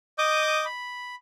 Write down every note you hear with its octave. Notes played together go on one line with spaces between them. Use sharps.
D#5 D6 D#6 G6
B5